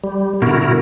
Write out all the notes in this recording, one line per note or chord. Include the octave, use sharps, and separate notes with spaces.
G3
B2 D3 E4 F#4 A#4